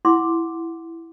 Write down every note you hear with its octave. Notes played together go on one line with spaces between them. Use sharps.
E4 F#5 C6 D6